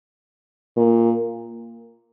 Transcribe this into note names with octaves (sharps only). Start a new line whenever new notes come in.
A#2